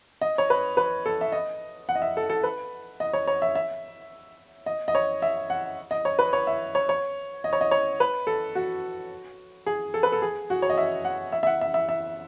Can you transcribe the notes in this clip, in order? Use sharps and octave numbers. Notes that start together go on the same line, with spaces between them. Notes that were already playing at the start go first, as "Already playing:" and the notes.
D#5
C#5
B4
B4
A4
E5
D#5
F#5
D#5
E5
A4
A4
B4
D#5
C#5
C#5
E5
E5
D#5
D#5
C#5
E5
F#5
D#5
C#5
B4
C#5
E5
C#5
C#5
D#5
C#5
D#5
C#5
B4
A4
F#4
G#4
A4
B4
A4
G#4
F#4
C#5
D#5
E5
F#5
E5
E5
F#5
E5
E5
E5